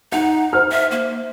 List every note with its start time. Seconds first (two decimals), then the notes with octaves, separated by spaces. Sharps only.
0.12 D#4 F#5
0.53 C5 F6
0.71 E5
0.91 A#3